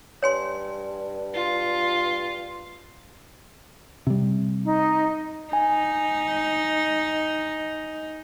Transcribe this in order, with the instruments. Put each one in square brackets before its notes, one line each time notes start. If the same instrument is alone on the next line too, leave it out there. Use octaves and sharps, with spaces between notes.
[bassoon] G2 [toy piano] C#5 G#5 C6
[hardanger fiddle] F4
[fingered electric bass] C3 G3
[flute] D#4
[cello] D#4 [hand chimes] G#5